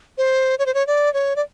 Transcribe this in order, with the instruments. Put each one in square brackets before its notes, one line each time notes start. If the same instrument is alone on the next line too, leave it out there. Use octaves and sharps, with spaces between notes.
[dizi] C5
C#5
C5
C#5
D5
C#5
D5